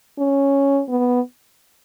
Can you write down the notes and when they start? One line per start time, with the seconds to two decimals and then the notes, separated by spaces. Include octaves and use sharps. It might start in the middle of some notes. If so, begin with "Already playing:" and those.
0.19 C#4
0.89 B3